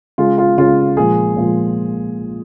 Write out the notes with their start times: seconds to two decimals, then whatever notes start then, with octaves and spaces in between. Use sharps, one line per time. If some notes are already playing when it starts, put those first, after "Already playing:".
0.18 C#3 G#3 F4
0.38 F4
0.58 C#3 G#3 F4
0.97 A#2 F3 G#3 G#4
1.36 A#2 F3 G#3